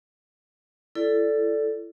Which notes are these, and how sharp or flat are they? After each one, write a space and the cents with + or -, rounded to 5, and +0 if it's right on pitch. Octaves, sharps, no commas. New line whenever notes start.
E4 +35 A4 +0 D5 -5